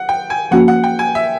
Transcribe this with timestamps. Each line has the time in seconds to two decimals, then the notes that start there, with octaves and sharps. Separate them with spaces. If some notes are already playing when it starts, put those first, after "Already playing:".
Already playing: F#5
0.09 G5
0.30 G#5
0.51 F3 A#3 C#4 F#4 F#5
0.68 F#5
0.84 G5
0.99 G#5
1.15 E5